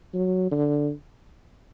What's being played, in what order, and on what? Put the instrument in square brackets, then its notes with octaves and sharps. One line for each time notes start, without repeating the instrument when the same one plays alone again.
[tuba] F#3
D3